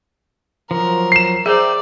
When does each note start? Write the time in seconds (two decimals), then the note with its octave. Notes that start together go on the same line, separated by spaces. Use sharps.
0.71 F3 F#3 A#4
1.12 C7 E7
1.46 G#4 C5 D5 E5 G5 A#5